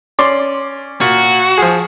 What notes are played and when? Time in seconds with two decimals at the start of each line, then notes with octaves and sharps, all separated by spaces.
0.19 C#4 D5 C6
1.01 A#2 F#4
1.58 F3 G#4